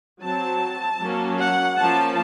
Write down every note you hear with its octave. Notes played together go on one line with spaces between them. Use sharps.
F#3 C4 A5
F#3 A#3 C#4
F#5
F3 A#3 C#4 A5